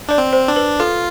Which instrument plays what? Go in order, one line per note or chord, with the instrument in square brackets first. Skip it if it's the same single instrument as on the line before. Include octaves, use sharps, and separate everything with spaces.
[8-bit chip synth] D4 [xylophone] D5
[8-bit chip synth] C4
[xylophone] C5
[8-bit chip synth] D4
[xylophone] B4
[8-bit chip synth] F4 [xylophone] A4